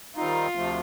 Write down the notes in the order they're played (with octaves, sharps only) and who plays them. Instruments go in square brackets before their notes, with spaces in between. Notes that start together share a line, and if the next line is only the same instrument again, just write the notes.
[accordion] D#3 G3 C4 D#4 [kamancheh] F4
[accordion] D2 C3 F3 A3